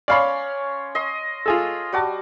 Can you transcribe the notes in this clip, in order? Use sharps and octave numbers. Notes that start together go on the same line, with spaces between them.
C#4 C#5 D5 F5 B5 C6
D#5 C6
F4 G#4 A4
G3 F#4 A5